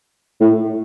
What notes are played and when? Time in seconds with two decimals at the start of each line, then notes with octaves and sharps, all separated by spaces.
0.41 A2